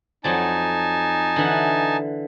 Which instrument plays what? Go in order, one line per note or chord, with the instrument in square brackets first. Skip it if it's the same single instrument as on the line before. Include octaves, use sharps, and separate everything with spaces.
[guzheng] F2 F#3 D5 [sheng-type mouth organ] D#4 G#5 A5
[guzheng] D3 E3 F#5